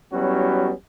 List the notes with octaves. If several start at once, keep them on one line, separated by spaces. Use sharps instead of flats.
F#3 G3 B3 C#4 E4 F#4